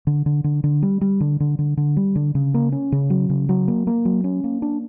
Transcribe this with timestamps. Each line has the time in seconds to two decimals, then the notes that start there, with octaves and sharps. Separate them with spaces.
0.07 D3
0.26 D3
0.44 D3
0.64 D3
0.82 G3
1.01 G3
1.20 D3
1.40 D3
1.59 D3
1.77 D3
1.97 G3
2.15 D3
2.35 C#3
2.54 A#3
2.72 C#4
2.92 C#3
3.10 F#3
3.30 C#3
3.49 F#3
3.68 A#3
3.87 A#3
4.05 F#3
4.24 C#4
4.44 A#3
4.62 D4